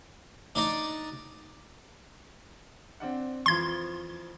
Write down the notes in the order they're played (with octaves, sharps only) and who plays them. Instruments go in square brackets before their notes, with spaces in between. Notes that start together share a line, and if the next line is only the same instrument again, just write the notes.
[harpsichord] D4 D#4 D5
[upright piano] C4 D4 F#5
[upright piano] F2 E3 F3 [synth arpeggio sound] C6 G#6